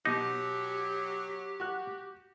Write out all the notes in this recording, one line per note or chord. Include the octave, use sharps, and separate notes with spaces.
B2 F#3 D#4 G4 D6
F#4 F#6